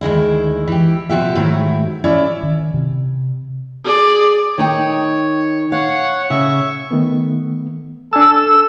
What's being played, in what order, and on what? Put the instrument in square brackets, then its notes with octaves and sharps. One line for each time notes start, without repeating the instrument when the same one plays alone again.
[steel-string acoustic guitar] D2 D#3 G#3 E4
E3 G4
B2 F3 F#4 G4 E5
G#2 D#3 F#3 A3 E4
C#4 E4 D5 E5
[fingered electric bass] D#3
C3
[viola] G#4 D5
[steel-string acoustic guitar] D#3 D#4 G5 [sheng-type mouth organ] C#5
[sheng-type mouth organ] C#5 F#5 [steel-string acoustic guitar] F5
[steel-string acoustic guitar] C#3 [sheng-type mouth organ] E5 C#6
[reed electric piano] D#3 A3 B3
[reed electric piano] D4 G#5 A5 [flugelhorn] A4 [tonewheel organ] E6